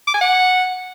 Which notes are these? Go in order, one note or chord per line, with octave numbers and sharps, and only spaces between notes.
D6
G#5
F#5